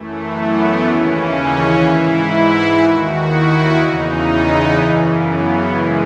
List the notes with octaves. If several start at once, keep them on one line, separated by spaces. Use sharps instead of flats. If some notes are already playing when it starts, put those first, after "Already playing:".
Already playing: F#2 E3 A3
B3
D#2 C#3 E3 C#4
G#2 E3 E4
D#2 D#3 F#4
E4
E2 C#3 E3 D#4
B3
F#2 C#3 E3
B3
F#2 C#3 E3 G#3